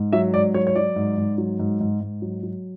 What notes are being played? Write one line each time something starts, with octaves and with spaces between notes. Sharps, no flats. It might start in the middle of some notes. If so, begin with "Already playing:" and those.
Already playing: G#2
F#3 E5
G#2 D5
F#3 C#5
C#5
F#3 D5
G#2
G#2
F#3
G#2
G#2
G#2
F#3
F#3